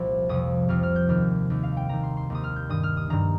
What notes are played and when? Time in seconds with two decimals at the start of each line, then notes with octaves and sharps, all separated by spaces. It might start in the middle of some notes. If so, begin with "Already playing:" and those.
Already playing: C2 A#2 F3
0.29 F2 C3 F3 D#6
0.69 F2 C3 F3 F6
0.83 F6
0.96 G6
1.09 D#2 D#3 F6
1.50 D#2 D#3
1.63 F5
1.77 G5
1.89 D#2 D#3 A#5
2.03 C6
2.17 C6
2.30 D#2 D#3 D#6
2.44 F6
2.56 G6
2.69 G2 D#3 D#6
2.83 F6
2.97 D#6
3.10 G2 D#3 A#5